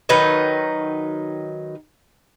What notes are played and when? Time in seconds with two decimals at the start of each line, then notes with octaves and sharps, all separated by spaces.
0.09 D#3 F#3 D#4 B4